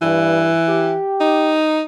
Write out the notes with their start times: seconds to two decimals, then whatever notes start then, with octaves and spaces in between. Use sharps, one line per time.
0.02 G2 E3
0.68 G4
1.21 D#4